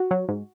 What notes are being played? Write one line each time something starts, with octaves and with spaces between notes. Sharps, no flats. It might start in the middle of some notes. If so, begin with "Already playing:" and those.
Already playing: F#4
F#3
G#2